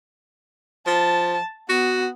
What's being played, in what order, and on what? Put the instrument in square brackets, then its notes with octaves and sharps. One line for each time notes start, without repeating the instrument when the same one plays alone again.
[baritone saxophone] F3 [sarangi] A5
[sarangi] B3 [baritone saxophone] F#4